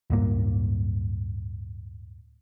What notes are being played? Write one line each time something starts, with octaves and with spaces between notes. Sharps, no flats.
D1 G2 A#3